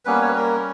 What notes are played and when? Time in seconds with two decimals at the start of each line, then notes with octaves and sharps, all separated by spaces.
0.05 G3 A#3 B3 C#4 B4
0.22 C#5
0.28 B4
0.35 A#3 A#4